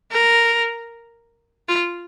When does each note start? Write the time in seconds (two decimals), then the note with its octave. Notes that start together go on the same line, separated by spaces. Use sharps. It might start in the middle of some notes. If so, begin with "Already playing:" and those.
0.11 A#4
1.68 F4